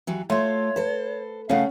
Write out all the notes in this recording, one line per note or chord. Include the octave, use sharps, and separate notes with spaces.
D#2 E3 F#3
A3 F4 C#5 E5 C6
A4 B4 C5
C#3 A3 C#4 F5 F#5